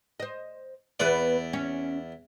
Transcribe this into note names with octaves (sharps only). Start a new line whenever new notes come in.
C5 D#5
E2 B3 B4 D5
C#4